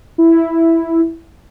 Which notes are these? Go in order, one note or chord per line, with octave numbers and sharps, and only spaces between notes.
E4